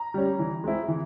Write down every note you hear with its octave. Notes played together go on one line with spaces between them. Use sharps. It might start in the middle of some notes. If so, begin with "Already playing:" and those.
Already playing: A#5
G3 C#4
E3
G#3 C4 E4
E3